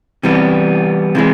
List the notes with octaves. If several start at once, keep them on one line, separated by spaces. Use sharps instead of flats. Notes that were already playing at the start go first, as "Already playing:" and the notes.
C3 E3 G3 B3
C3 E3 G#3